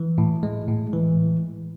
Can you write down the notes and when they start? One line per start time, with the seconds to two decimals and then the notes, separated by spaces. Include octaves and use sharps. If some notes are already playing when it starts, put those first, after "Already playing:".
Already playing: E3
0.18 A2
0.43 G#3
0.68 A2
0.93 E3